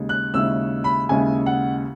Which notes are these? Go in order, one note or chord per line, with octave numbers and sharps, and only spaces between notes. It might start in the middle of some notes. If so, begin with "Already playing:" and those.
Already playing: D#2 C#3 G#3
F#6
D#2 C#3 G#3 C#4 E4 E6
B5
D#2 C#3 G#3 C#4 E4 G#5
F#5